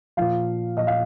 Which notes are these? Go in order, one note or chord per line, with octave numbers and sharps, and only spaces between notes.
A#2 F3 F5
A#2 F3 D#5
F5